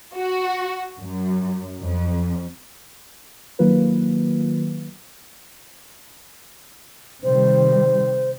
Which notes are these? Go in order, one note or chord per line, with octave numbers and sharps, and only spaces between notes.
F#4
F#2
F2
D#3 F#3 A#3 F4 B4
C3 D#3 G3 C5